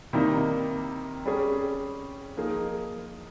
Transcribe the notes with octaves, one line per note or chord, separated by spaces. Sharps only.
C3 D#3 G3 A#3 D#4
G3 C#4 G#4
F3 A#3 D#4 G#4